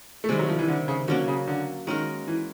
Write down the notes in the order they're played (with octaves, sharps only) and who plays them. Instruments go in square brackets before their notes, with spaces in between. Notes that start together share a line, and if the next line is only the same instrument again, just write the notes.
[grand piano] A3
[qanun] C3 D#3 G3 [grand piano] G#3
[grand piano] F#3
F3
E3
D3
C#3
[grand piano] D3 [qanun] F#3 A#3 C#4 F#4
[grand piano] C#3
D3
[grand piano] D#3 [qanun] G#3 C#4 F#4 A#4
[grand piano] E3